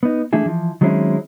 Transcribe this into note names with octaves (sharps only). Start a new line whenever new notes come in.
B3 D#4
E3 A3 D4 E4 G#4
E3 F3
D#3 F#3 G#3 C4 C#4 E4